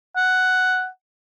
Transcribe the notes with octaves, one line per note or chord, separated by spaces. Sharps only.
F#5